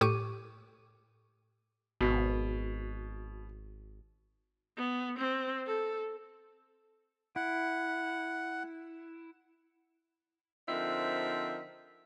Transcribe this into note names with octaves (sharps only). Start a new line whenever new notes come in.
A2 G4 C#6 D6 D#7
G#1 B2
B3
C4
A4
E4 F#5
D3 F3 C4 D#4 A#4 E5